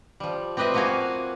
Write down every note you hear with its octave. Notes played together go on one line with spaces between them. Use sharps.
F3 G3
C4 G4 B4 D#5 E5
F3 A#3 F#4 F5 G#5